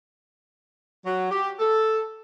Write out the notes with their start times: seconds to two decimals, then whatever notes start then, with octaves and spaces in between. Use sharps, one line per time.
1.05 F#3
1.30 G4
1.60 A4